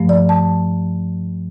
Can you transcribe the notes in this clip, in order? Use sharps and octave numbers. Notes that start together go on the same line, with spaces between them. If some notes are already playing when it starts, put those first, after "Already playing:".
Already playing: G2 F3 A3
D5
A5